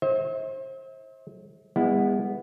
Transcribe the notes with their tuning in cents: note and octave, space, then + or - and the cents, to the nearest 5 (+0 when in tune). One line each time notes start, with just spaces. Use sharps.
C5 +35 E5 -45
G#3 -35 B3 +0 E4 +0